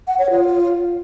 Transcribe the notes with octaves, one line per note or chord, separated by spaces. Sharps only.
F#5
C#5
F4